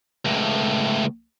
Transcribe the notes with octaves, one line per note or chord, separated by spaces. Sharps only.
C#2 A2